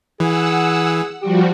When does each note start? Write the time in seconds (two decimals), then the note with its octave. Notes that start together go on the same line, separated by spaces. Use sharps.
0.20 E3 G#4 F#5 E6
1.22 F3 G3 F#4 G4